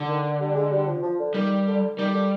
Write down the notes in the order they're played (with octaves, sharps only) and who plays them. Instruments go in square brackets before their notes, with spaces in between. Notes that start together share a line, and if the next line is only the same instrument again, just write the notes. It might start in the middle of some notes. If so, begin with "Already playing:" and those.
Already playing: [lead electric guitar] D3
[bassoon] D#3
G3
G#3
G3
F3
F3
D3
[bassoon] D#3 [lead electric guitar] G3
[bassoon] D3
[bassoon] D#3 [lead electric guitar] G3
[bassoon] D3